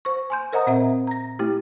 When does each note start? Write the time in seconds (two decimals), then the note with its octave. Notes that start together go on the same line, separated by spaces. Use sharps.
0.05 C5 C#6
0.30 G#5 C6 G6
0.53 A#4 C5 D#5 F#5 A#5 D#6
0.67 A#2 C4 C5 E5 A#5
1.07 A#5 A#6
1.39 A3 E4 G4